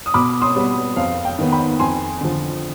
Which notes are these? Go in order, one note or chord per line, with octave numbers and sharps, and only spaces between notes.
D#6
B2 B5 D6
C6 D#6
G3 B3
F2 F5
G5
D#3 B3
G5 B5
F2 G#5 C6
D3 F3